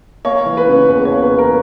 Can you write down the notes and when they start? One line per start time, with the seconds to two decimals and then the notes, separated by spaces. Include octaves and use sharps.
0.25 A#3 C#5
0.46 E3
0.57 B4
0.68 C#3
0.89 E2 B4
1.05 C#5
1.12 A#3
1.22 B4
1.33 E3
1.39 A#4